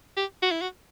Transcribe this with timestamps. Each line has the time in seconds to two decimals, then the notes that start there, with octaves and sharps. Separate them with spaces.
0.17 G4
0.43 F#4
0.51 E4
0.61 F#4